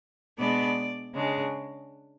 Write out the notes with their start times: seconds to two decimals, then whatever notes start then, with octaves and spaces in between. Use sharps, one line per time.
0.39 B2 G#3 B3 D4 D5
1.14 C#3 G#3 D4